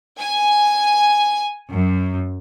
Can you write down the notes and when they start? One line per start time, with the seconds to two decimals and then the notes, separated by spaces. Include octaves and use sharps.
0.19 G#5
1.71 F#2